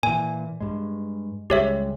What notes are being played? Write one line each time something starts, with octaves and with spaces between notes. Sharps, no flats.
A#2 E3 G#5
G2 G#3
C#2 G3 G#3 G4 C#5 E5